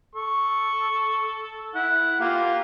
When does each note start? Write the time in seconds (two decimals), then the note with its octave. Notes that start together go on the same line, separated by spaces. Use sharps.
0.15 A4 C#6
1.75 E4 F#5
2.20 A#3 F4 G4